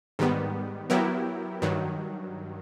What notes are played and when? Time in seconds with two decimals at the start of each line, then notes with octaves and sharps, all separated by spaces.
0.19 G#2 D#3 G3 B3
0.90 F#3 B3 E4 G4 A#4
1.62 G2 D#3 F#3